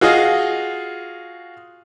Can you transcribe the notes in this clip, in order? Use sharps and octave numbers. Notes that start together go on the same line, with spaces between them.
F4 F#4 G#4 D#5 F5